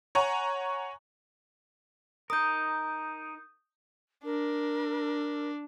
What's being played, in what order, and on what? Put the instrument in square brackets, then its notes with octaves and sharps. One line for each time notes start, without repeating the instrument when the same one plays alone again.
[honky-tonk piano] C#5 F#5 G#5 A#5 C#6
[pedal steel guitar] D#4 A#4 [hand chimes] D#6 G6
[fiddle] D4 [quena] A#4